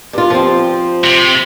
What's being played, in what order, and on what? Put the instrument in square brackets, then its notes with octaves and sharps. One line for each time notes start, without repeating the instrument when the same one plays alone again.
[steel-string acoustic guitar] G2 F4
F3 C4
[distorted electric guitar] C3